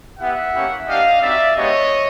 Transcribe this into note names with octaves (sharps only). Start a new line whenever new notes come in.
B3 E4 G4 E5 F#5
A#3 C#4 E4 G4
A#3 D4 G4 D#5 F5
C4 D#4 F#4 D5 E5
G#3 B3 D4 G4 C#5 D#5